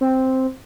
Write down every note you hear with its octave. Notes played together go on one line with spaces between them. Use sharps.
C4